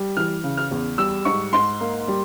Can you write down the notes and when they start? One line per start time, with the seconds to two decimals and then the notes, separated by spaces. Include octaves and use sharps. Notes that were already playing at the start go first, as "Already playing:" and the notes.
Already playing: G3
0.17 E3 F6
0.43 C#3
0.57 F6
0.71 E2
0.98 G3 E6
1.25 G#2 C#6
1.53 G#2 C6
1.81 A#3
2.08 G3